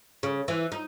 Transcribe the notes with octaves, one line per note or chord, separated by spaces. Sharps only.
C#3
E3
D#4